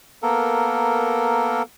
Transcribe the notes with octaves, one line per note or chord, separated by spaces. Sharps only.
A#3 B3 A4 A#4